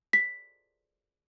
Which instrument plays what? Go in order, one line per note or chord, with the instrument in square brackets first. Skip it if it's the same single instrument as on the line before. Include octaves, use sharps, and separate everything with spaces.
[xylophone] B6